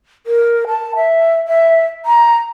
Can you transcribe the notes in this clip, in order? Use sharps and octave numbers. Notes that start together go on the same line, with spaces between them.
A#4
A5
E5
E5
A#5